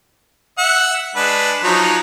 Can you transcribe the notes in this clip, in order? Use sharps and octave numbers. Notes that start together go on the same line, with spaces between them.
E5 F#5 E6
G#3 D4 B4
F3 F#3 D#4